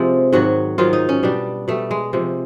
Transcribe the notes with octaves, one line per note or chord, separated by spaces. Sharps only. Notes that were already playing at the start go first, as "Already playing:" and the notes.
Already playing: C3 F3 G#3 F4
G#2 D#3 F#3 F#4
G#2 D#3 F#3 F4
D#4
C#4
B2 G3 D4
B2 G3 A3
G#3
C3 F3 G#3